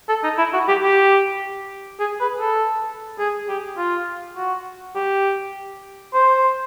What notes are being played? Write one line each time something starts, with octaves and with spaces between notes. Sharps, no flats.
A4
D#4
E4
F#4
G4
G4
G#4
B4
A4
G#4
G4
F4
F#4
G4
C5